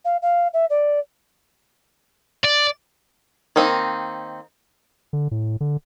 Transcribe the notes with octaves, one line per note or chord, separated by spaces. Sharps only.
F5
F5
E5
D5
D5
D#3 A#3 C4 D#4
D3
A2
D3